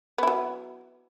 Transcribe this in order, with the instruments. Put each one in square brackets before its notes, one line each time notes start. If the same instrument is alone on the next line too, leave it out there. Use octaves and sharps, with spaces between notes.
[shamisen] B3
E4
F#3